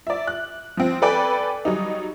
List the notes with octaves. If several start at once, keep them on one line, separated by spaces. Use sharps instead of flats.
D5 E5
F#6
F3 C4
A4 B4 D5 G5 G#5 B5
F#3 G3 D#4